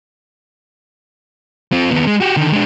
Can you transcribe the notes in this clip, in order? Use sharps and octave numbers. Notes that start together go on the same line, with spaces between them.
C4 F4
D#2 B3
G#3
F#4 G4
D3 D#3
G#3 D4